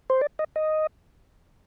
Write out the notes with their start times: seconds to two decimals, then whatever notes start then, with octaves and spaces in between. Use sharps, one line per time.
0.10 C5
0.21 D5
0.39 D#5
0.56 D#5